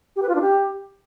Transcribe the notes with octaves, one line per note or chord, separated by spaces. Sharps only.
G4
B4
F4
D4
G4